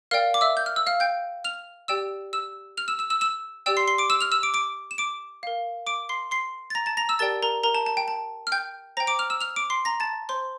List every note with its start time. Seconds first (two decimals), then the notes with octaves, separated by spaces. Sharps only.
0.11 A#4 D5 F5 G5 F6
0.34 D6
0.41 E5 E6
0.57 G6
0.66 F6
0.76 E6
0.87 F5 F6
1.00 G5 G6
1.44 F6 F7
1.88 G4 D5 G5 E6 E7
2.33 E6 E7
2.77 F6 F7
2.88 E6 E7
2.99 E6 E7
3.10 E6 E7
3.21 E6 E7
3.66 G4 D5 G5 E6 E7
3.77 C6 C7
3.87 C6 C7
3.98 D6 D7
4.10 E6 E7
4.21 F6 F7
4.32 E6 E7
4.43 D6 D7
4.54 D6 D7
4.91 E7
4.98 D6 D7
5.43 A#4 F5
5.87 D6 D7
6.09 C6 C7
6.31 C6 C7
6.70 A6
6.75 A#5 A#6
6.86 A5 A6
6.97 A#5 A#6
7.09 E6 E7
7.19 G4 A#4 D5 G5 A5 A6
7.43 A#4 A#5
7.63 A#4 A#5
7.75 A5
7.86 A5
7.97 G5
8.08 A5
8.47 F6
8.52 G5 G6
8.97 C5 G5 A#5 A#6
9.07 D6 D7
9.19 F6 F7
9.30 E6 E7
9.41 F6 F7
9.56 D6 D7
9.70 C6 C7
9.85 A#5 A#6
10.00 A5 A6
10.29 C5 C6